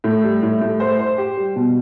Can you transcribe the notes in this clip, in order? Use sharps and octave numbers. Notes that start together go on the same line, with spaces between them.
A2
G3
A2
A2
C5
C5
G4
G3
B2